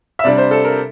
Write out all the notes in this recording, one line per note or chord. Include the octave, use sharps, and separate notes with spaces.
E5
C3 G3 D4 D5
C5
A4
A#4